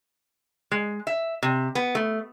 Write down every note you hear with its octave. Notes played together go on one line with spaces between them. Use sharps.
G#3
E5
C3
B3
A3